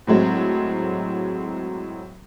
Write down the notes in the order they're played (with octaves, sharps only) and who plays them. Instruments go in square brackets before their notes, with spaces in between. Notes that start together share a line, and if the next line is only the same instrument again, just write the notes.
[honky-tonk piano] A2 F#3 G#3 C4